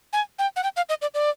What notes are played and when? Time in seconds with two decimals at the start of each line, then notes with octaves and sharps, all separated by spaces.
0.13 G#5
0.39 G5
0.56 F#5
0.63 G5
0.76 F5
0.89 D#5
1.02 D5
1.14 D5